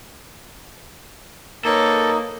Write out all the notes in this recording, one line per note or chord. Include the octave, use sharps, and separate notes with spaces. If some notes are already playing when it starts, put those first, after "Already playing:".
A#3 D#4 A4 B4 C#5